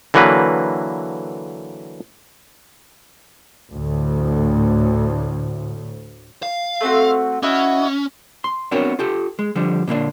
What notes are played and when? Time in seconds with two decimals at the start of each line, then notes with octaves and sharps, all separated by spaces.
0.14 D3 E3 F#3 A#3 B4
3.73 D2 A2
6.43 F5
6.81 A3 C4 F#4
7.43 C#4 E4 F#4 D#5
8.44 C6
8.71 B3 C4 D4 F#4 A#4 C#5
8.99 F4 G4 A4
9.39 G#3
9.56 D3 F3 G3
9.87 A#2 D3 A#3 D4